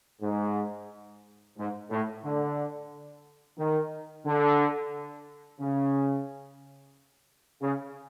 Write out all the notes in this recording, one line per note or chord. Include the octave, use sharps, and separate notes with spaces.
G#2
G#2
A2
D3
D#3
D3
C#3
C#3